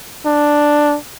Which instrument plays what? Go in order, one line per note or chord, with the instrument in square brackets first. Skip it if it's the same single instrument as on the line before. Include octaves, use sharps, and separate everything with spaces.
[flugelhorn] D4